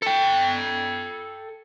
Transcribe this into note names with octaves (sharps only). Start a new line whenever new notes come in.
A4 G5